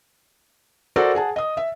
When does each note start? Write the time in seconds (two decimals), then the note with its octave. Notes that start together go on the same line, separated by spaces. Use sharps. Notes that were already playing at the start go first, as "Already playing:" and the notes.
0.96 F#4 A4 A#4 C5 D5 F#5
1.15 G#4 F#5 A5
1.36 D#5 D#6
1.57 E5